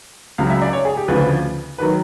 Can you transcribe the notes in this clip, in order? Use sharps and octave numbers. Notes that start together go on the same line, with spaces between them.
C#2 C#3 F#3 F5
E5
D5
C#5
G#4
G4
D2 C#3 F3 B4
D#3 F#3 B4